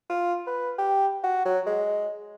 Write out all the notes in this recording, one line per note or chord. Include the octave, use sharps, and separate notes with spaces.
F4
B4
G4
F#4
F#3
G#3